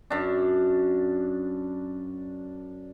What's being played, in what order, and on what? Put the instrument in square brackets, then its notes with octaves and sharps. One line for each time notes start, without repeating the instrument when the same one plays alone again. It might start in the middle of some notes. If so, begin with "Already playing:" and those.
[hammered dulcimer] F#2 D4